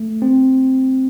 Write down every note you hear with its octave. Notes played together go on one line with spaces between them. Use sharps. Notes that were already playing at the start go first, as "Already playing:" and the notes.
Already playing: A3
C4